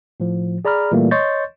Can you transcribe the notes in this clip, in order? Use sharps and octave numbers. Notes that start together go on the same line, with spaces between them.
A2 F3
G#4 D5 A#5 B5 F6
A#2 E3 G3 A3 A#3
C#5 D#5 C6 C#6 G6 A6